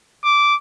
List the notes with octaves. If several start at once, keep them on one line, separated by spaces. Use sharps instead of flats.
D6